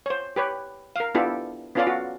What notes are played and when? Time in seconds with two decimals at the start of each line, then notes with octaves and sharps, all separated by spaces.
0.06 C5 C#5
0.36 G4 B4 C#5
0.96 A#4 F5
1.15 B3 D4 E4 F4 G4 A4
1.75 B3 C#4 F4 A4 D5 F5
1.87 F#4